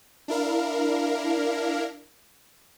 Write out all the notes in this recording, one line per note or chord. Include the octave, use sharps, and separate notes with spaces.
D4 E4 A#4 F5